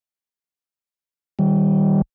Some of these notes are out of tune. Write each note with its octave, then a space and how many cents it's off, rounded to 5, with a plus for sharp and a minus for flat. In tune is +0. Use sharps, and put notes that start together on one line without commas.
D#3 +0 G3 -10